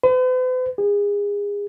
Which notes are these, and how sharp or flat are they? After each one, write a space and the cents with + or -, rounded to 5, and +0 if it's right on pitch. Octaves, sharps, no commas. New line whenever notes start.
B4 +45
G#4 -30